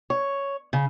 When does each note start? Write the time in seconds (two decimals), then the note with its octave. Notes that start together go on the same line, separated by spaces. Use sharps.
0.10 C#5
0.73 C#3